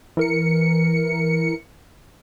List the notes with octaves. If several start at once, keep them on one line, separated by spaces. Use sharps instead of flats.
E3 A#4 C#7